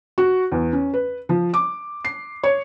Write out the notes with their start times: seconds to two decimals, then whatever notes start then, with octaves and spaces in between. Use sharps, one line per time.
0.18 F#4
0.52 E2
0.73 C#4
0.94 B4
1.29 F3
1.54 D6
2.05 C7
2.43 C#5